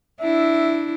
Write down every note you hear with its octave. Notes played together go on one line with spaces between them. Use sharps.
D4 E4 E5